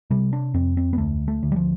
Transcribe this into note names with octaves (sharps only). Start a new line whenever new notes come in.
C3 G3
D4
F2 C4
C4
B3
D2 A3
A3
D2
G3
F3